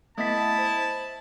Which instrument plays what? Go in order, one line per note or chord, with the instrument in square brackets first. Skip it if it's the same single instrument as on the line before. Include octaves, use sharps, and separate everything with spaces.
[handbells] A3 B3 B6 [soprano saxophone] E4 [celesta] D#5 D#6 [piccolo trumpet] A5
[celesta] C5